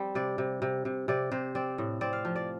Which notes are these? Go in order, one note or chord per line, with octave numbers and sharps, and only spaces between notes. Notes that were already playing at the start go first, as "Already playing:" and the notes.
Already playing: G3 C4 C5
C3 D5
C3
C3
C3
C3 D5
C3 C5
C4 D5
A2
C4 D5
F5
F3
D5